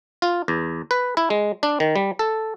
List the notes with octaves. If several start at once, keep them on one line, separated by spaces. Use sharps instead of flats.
F4
E2
B4
E4
G#3
D4
D#3
G3
A4